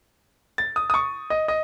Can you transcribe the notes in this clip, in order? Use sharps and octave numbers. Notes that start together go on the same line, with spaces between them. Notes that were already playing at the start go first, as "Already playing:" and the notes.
A6
D#6
D#6
C#6
D#5
D#5